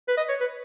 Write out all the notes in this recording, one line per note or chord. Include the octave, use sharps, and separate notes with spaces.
B4
D#5
C#5
B4